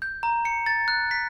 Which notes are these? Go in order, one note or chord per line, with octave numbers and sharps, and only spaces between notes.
G6
A#5
C#7
A6
F#6
B6